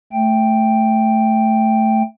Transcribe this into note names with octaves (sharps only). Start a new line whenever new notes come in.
A3 G5